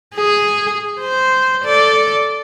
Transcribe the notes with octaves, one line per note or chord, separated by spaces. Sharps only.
G#4
C5
A4 D5